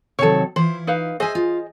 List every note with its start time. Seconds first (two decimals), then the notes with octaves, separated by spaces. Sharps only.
0.19 C3 D#3 F#3 A4 C#5
0.56 E3 E4 F4 C5
0.87 D#4 B4 F5
1.20 G#4 C5 D#5 E5 G#5
1.35 F4